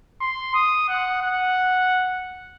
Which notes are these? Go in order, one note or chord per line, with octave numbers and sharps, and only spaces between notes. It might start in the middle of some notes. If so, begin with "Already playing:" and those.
C6
D#6
F#5
F#5